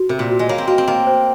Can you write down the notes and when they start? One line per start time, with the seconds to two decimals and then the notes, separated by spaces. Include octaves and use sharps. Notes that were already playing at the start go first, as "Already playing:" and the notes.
Already playing: F#4
0.09 C3 A#4
0.19 A#2
0.29 F#4
0.39 G#3
0.49 A#3 C#5
0.58 C4
0.68 A#3 F#4
0.78 C4
0.88 A#3 D#5
1.07 C5